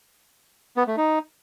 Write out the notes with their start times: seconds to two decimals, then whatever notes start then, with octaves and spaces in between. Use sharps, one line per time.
0.77 B3
0.87 A3
0.97 D#4